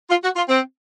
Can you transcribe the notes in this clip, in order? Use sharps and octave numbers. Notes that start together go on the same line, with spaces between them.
F4
F#4
F4
C4